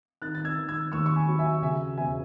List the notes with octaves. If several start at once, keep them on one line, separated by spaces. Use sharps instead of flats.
D#3 F#6 A6
A6
E6 G#6
D#3
E6 G#6
D#2 C#6 E6
C#6
G#5 B5
F#3
E5 G#5
C#3 E5 G#5
E1 E5 G#5